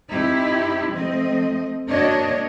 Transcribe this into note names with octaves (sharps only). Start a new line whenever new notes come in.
C4 D#4 E4 G4
F3 A3 C4 D#5
A#3 D4 F#4 C#5 D#5